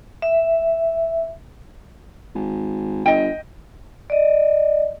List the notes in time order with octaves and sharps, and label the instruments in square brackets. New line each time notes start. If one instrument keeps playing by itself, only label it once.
[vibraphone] E5
[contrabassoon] G#1
[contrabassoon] G1 [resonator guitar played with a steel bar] D#5 G5
[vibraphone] D5 D#5